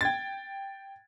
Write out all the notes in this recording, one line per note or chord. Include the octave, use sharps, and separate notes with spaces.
G5 G#6 A6